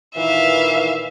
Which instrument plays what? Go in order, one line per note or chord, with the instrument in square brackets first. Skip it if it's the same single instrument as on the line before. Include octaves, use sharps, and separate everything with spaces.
[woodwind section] A#2 D#3 E3 [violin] E5 F5